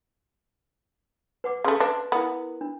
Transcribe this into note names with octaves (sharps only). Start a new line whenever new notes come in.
B4 F#5 D6
C#3 A3 C6
D4 B4
B3 E4 A#4
D4